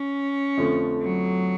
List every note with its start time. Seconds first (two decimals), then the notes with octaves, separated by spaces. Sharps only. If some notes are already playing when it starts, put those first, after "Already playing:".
Already playing: C#4
0.57 F2 D3 F3 A3
1.02 F#3